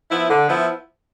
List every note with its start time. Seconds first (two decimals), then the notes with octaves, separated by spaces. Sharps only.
0.10 F3 B3 E4
0.29 D3
0.48 F3 B3 E4